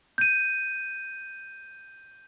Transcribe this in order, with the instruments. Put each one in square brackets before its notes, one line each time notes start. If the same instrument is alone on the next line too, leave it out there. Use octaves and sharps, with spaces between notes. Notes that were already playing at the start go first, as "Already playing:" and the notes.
[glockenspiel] G6 D#7